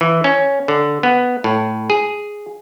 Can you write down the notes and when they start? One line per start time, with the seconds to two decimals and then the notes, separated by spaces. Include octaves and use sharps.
0.01 E3
0.24 C#4
0.68 D3
1.03 B3
1.44 A2
1.90 G#4